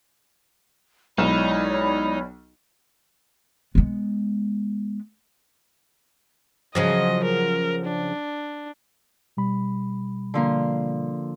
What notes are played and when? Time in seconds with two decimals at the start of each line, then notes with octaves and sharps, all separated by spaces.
1.18 B1 G#3 D#4 E4 C#5 D5 B5 E7
3.75 G#3 B3
6.75 C#3 F3 F#3 D#5
7.25 A#4
7.87 D4
9.37 B2 G3 B5
10.34 D3 F3 A#3